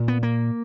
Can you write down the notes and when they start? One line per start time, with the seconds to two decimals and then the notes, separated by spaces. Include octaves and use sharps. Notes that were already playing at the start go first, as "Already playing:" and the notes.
Already playing: A#2
0.08 B3
0.23 A#3